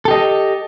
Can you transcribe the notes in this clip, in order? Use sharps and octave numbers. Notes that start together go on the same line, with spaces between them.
G4 A4 D#5